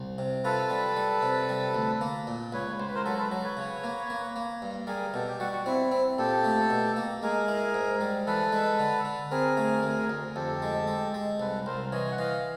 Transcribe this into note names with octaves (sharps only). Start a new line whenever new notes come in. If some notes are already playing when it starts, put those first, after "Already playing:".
Already playing: C2
C3
F4 A4 B4
G3
G3
C3
G3
D2
A#3
A#2
C#2 B4 C#5
C#2 C5
B4
A#4 C5
F#3 A4 B4
A4 B4
F#3
B4 C#5
C#3
A#3
A#3
A#3
G2
G3 G#4 A#4
B2 G4 A4
G4
G3 F#4
F#4
C4 E4
C4
A#2 G4 A4
A3
B2
A#3
G#3 G#4 A#4
E4
G#2
G3
E3 A4 B4
G#3
D3
D3
C4 G#4 A#4
A3
D2
D2
F2 G4 A4
G#3
G#3
G#3
C2 A4 B4
C2 A#4 C5
E3 C#5 D#5
F#5
E3 D#5 F5